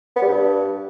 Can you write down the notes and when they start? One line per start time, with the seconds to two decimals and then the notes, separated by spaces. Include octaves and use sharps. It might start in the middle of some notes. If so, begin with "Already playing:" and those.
0.16 B3
0.22 G3
0.28 G2